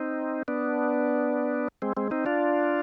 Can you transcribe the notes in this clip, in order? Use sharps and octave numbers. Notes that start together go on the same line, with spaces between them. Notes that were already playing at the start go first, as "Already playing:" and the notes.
Already playing: C4 D#4
B3 D4
G#3 C4
G#3 C4
C4 D#4
D4 F4